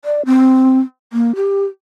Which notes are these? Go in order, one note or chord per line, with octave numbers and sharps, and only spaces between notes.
D5
C4
A#3
G4